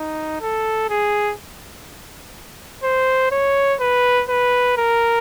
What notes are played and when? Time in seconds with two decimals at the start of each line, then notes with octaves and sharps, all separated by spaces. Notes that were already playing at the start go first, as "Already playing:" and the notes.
Already playing: D#4
0.41 A4
0.90 G#4
2.83 C5
3.31 C#5
3.80 B4
4.29 B4
4.77 A#4